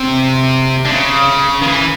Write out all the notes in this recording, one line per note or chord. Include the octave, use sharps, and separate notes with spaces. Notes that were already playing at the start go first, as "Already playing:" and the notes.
Already playing: C3
D3
C#3
D#3
E3